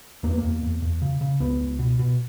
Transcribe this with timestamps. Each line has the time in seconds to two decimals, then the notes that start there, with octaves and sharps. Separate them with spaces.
0.23 E2 A#3
0.31 B3
0.38 A#3
0.43 E2
0.63 E2
0.82 E2
1.02 C#3
1.21 C#3
1.40 C#2 B3
1.60 C#2
1.79 B2
1.99 B2